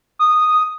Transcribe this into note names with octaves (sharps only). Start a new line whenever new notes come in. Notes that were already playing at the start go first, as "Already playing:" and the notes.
D#6